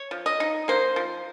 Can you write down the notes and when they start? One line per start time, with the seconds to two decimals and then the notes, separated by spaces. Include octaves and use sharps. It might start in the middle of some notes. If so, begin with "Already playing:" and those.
Already playing: C#5
0.11 F3
0.26 D#5
0.40 D#4
0.68 A#3 C5
0.96 F3